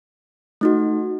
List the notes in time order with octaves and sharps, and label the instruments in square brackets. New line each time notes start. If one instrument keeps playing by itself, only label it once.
[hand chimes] A3 D#4 F#4